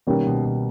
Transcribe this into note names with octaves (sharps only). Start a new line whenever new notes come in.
B2 D#3 G3 A#3 C#4
B2
B2